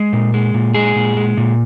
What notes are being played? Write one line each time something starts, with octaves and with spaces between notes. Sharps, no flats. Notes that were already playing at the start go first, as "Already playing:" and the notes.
Already playing: G#3
A#2
G#3
A#2
G#3 G#4
A#2
G#3
A#2